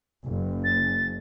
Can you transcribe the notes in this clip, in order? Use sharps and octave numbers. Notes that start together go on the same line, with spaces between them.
F#1
A6